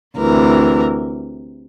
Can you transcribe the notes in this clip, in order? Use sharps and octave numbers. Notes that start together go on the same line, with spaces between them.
D2 C3 E3 A#4